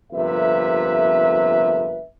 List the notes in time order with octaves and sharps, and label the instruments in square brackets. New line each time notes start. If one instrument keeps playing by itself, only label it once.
[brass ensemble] G1 F2 C3 A#3 B4 E5